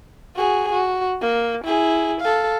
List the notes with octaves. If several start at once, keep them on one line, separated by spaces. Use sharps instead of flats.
F#4 G#4
F#4
A#3
E4 G#4
A4 F5